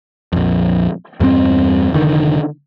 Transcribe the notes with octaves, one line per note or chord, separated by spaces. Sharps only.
A#1 F2
E2 G2 A#3 C4
F1 D3 D#3